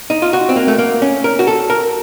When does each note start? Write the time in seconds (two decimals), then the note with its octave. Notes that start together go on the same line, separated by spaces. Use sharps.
0.10 D#4
0.22 F4
0.33 F#4
0.49 C4
0.56 A#3
0.68 A3
0.78 A#3
1.02 C#4
1.24 A#4
1.39 F#4
1.47 A4
1.70 A#4